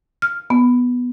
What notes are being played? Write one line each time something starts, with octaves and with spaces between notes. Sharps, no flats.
F6
B3